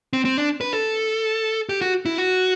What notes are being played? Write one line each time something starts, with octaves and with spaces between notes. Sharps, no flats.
C4
C4
D4
B4
A4
G4
F#4
E4
F#4